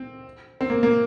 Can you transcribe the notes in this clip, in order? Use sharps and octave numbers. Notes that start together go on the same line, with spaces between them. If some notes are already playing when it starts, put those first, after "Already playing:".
Already playing: C4
C4
A#3
A#3